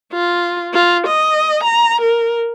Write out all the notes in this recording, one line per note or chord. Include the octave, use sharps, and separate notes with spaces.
F4
F4
D#5
A#5
A#4